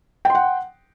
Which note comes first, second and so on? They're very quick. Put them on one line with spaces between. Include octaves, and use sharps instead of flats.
G5 C6 F#5